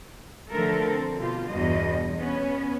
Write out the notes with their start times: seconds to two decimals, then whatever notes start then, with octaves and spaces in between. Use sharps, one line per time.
0.51 D3 F3 A3 A4 A#4
0.90 C4
1.19 B2 F4 G4
1.49 E2 G2 B2 D#5
2.18 B3 C#4